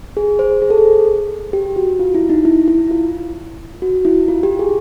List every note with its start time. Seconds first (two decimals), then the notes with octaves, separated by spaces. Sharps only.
0.17 G#4
0.39 C5
0.62 G#4
0.70 A4
0.78 G#4
1.53 G4
1.76 F#4
1.99 F4
2.14 E4
2.29 D#4
2.45 E4
2.68 E4
2.91 F4
3.82 F#4
4.05 E4
4.28 F4
4.43 G4
4.59 G#4